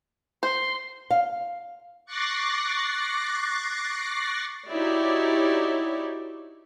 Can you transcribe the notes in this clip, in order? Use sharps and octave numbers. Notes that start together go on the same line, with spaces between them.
C5 C6
F5
C#6 D6 F#6 A6 A#6 C7
D#4 E4 F#4 G4 C#5 D5